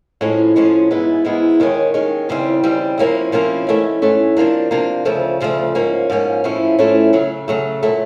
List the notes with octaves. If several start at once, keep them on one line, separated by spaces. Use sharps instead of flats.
A2 F3 G#3 C#4
A2 F3 G#3 C#4
G#2 E3 G#3 B3 E4
G#2 E3 G#3 B3 E4
D#2 D#3 G#3 C#4
D#2 D#3 G#3 C#4
D#2 C#3 E3 G3 C4
D#2 C#3 E3 G3 C4
C3 F3 A#3 C#4 E4
C3 F3 A#3 C#4 E4
G#2 E3 A3 C#4
G#2 E3 A3 C#4
C3 F3 A#3 D4
C3 F3 A#3 D4
D2 C#3 F3 A3
D2 C#3 F3 A3
G#2 F3 A#3 C#4
G#2 F3 A#3 C#4
A2 F3 A3 C#4 E4
A2 F3 A3 C#4 E4
C#3 F#3 A3
C#3 F#3 A3
A#2 F#3 A3